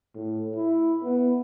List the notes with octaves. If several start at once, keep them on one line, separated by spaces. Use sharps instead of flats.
A2
E4
B3